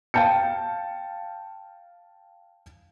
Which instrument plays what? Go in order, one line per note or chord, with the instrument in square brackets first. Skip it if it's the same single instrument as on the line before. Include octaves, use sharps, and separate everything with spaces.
[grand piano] F5 G5 A5 G6 C#7